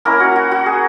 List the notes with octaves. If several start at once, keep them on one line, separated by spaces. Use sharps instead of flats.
A#3 C#4 E4 A#4
F#4
F#4
F#4
G#4